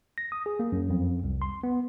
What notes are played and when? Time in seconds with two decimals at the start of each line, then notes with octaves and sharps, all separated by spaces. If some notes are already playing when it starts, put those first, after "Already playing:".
0.18 A#6
0.32 D#6
0.46 G#4
0.60 A#3
0.72 F#2
0.90 F2
1.24 C2
1.42 C6
1.63 B3